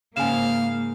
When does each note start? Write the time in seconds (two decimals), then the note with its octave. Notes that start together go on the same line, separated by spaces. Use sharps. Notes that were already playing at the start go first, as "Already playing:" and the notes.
0.17 G#2 C#3 A#3 F5 G#5 E7